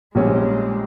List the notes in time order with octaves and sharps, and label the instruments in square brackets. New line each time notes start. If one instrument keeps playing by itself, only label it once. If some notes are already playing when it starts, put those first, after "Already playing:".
[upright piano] A#1 A#2 G3 C#4 [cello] G#3